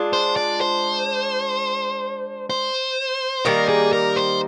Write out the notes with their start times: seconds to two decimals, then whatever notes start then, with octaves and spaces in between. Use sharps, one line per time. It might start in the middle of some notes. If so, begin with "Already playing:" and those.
Already playing: G#3 D4 F4
0.13 C5
0.36 D5
0.61 C5
2.50 C5
3.45 D#3 G3 A#3 D#4 A#4
3.69 G#4
3.93 A#4
4.16 C5